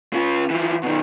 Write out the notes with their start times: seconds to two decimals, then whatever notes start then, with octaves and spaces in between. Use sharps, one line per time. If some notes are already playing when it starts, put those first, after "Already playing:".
0.13 C#3 F4
0.50 E3 F3
0.83 B2 D#3